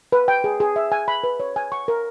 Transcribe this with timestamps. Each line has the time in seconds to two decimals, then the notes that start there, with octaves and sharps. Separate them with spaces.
0.12 B4
0.28 G5
0.44 G#4
0.60 G#4
0.76 E5
0.92 G#5
1.08 B5
1.24 B4
1.40 C#5
1.56 G#5
1.72 C#6
1.88 A#4